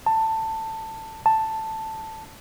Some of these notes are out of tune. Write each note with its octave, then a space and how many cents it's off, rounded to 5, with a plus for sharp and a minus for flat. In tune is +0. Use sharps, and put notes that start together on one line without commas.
A5 +15
A5 +5